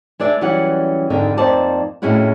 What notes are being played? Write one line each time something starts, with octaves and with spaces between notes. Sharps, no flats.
G#3 D4 D5 E5
E3 F#3 G3 C#4 D5 F#5
F2 G#2 D3 D#3
F2 A#3 D#4 C5 D5 A5
F2 A2 G#3 C#4 E4 F#4